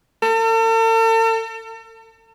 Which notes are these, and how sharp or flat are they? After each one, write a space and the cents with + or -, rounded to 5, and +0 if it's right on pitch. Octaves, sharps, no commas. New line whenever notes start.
A4 +45